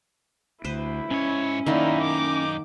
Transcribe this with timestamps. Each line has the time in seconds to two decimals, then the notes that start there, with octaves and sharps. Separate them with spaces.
0.65 D2 E4 B4 C5
1.11 G#2 C#4 C#5
1.67 F#2 D#3 A#3 D#4 E4 D5
2.00 D6